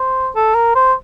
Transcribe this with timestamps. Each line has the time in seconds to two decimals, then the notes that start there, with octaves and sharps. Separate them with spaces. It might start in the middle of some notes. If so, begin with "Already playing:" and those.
Already playing: C5
0.36 A4
0.55 A#4
0.75 C5